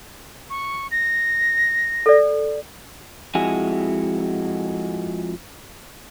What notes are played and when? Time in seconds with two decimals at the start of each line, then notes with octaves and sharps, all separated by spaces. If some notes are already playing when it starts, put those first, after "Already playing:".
0.50 C#6
0.91 A#6
2.06 A4 D5
3.35 F2 G#3 E4 F#4 G#5